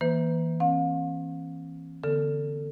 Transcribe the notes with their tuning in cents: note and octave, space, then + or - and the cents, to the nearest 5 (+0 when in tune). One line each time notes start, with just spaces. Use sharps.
E3 -15 A#3 +20 B4 +35
C4 +45 F5 +35
D3 -20 B3 -5 A4 +20